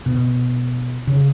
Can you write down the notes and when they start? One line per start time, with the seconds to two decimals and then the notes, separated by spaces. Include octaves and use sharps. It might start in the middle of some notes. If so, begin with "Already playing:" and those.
0.06 B2
1.07 C#3